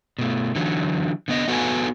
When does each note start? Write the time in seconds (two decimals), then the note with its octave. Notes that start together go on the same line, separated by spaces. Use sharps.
0.19 B2 A3
0.55 D3 E3 F#3
1.28 D3 B3 D#5
1.48 B3 F#4 A4 B4 F5 G#5